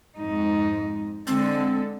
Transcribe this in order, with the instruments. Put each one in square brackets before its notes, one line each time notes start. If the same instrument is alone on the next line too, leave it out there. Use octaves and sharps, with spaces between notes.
[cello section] F2 G#2 D#4
[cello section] D3 G#3 A4 [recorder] C4